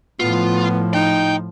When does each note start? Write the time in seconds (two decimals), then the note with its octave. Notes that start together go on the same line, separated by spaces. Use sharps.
0.20 A2 F3 B3 F4
0.94 D#4 G5